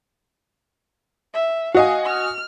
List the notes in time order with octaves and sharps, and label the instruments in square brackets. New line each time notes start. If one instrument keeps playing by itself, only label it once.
[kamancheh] E5
[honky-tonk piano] F#4 D#5 G#5 [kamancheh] F5
[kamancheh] F6